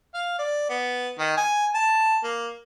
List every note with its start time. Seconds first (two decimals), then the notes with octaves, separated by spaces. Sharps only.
0.14 F5
0.39 D5
0.69 B3
1.19 D#3
1.37 G#5
1.74 A5
2.23 A#3